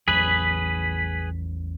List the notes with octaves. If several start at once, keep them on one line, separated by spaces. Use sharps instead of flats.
A1 E2 F#3 G#4 B4 B6